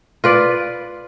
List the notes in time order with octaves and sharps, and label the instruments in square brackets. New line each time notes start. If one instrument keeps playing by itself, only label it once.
[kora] F4 B4 D5